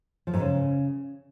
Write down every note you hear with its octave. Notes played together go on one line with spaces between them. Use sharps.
F3
G#2
C#3